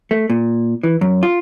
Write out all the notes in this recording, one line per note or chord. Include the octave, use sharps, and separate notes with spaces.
A3
A#2
E3
F#2
F4